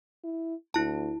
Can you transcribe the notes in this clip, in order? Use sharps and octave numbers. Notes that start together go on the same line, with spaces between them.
E4
D2 E4 A5